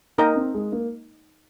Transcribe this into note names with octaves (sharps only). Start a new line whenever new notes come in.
A#3 D#4 A#4 D#5 G5
C4
G#3
A#3